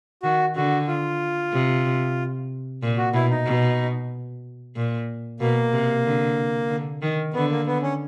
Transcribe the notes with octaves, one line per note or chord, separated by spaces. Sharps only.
D#3 F#4
D3 F#4
F4
C3
A#2
F#4
B2 E4
D#4
B2
A#2
B2 A#3
C3
D3
D3
D#3
D3 B3
A#3
B3
C#4